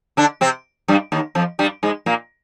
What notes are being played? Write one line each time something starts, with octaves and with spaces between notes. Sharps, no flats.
D3 D4
C3 C4
G2 G3
D#2 D#3
F2 F3
G2 G3
G#2 G#3
A#2 A#3